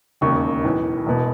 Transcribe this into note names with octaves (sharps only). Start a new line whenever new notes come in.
E1 D#2 C#3 C#6
B1 A2 E3
E1 E2 B2